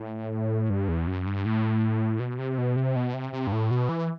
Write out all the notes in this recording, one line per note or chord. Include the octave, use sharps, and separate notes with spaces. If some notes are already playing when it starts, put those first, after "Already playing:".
Already playing: A2
G2
E2
F#2
G2
A2
B2
C3
B2
C3
B2
C3
C3
G2
A2
B2
E3